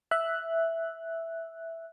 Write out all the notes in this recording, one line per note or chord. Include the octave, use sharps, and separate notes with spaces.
E5 F#6